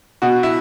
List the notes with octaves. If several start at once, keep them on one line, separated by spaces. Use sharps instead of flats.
B2 F#4
E4